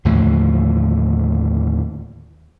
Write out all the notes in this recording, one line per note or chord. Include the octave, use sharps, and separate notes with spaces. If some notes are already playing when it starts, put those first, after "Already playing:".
D#2 A2 D3 F3